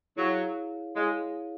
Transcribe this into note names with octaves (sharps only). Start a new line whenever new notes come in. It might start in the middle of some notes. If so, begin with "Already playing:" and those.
F#3 E4 G#4 C#5 F5
G#3 E4 G#4 C#5 F5